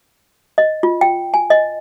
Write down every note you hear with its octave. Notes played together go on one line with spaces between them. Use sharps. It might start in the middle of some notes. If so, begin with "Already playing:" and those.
D#5
F4
G5
G#5
D#5